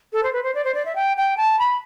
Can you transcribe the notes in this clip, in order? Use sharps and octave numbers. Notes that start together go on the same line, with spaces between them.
A4
C5
B4
C5
D5
C5
D5
E5
G5
G5
A5
B5